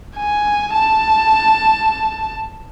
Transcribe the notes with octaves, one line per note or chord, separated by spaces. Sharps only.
G#5
A5